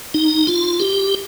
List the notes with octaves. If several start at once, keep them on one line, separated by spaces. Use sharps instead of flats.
D#4
F4
G4